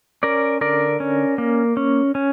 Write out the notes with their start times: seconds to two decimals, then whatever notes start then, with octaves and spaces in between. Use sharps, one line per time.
0.23 C#4 A#4 D5
0.61 D3 A#4 D5
1.00 C#4
1.38 A#3
1.77 C#4
2.15 C#4